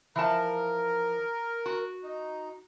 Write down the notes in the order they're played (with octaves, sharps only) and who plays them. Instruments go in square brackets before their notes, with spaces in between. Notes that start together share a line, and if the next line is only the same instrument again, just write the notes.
[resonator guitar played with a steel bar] E3 F3 A5 [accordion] A#4
[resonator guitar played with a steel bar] F#4
[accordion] D#4